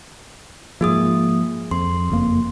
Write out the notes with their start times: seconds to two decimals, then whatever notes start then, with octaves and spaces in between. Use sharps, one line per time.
0.81 G#2 F3 A#3 G#4 D#6
1.71 F2 C6
2.10 F#1 F2 A#3